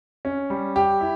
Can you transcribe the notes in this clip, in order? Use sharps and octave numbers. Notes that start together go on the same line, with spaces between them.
C#4
G3
G4
E4